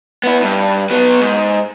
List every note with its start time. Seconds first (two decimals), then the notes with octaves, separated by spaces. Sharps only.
0.24 B3 E4
0.42 G2
0.90 F#3 B3
1.21 G#2